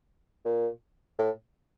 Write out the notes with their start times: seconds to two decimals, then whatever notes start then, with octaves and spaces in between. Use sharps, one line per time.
0.45 A#2
1.19 A2